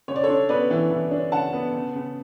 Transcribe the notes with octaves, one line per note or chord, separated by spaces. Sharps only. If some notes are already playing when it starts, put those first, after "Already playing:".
C#3 C#5
D5
D4 A4 C#5
B3 B4 D5
E3
E3
D4
C#3 F#5 A5
B3
C#3
C#3